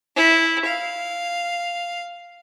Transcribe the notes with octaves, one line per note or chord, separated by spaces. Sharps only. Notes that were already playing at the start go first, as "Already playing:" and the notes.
E4
F5